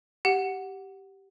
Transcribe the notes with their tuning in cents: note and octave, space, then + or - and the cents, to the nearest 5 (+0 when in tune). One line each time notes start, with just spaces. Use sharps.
G4 -10 F#5 +0